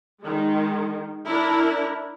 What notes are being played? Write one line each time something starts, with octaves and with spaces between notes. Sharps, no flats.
D#3 G#3
D4 E4 A#4